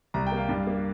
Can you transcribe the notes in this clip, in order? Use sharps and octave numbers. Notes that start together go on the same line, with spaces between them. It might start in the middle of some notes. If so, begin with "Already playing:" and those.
C2 A#5
G5
A#3 F5
G2
A#3